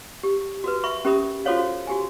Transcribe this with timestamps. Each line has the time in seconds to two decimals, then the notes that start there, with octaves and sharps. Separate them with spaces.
0.23 G4
0.64 F#4 A#4 B4
0.84 E5 B5 C#6
1.05 C#4 G4 A#4 E5 B5 D#6
1.45 F4 F#4 A4 C5 C#5 F5
1.87 F#4 G4 G#5